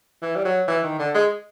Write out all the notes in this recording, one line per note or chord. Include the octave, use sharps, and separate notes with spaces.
E3
G3
F#3
E3
D#3
D3
G#3